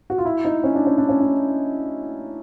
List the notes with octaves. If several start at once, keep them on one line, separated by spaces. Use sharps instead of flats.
F#4
F4
E4
D#4
C#4
D4
C#4
D4
C#4
D4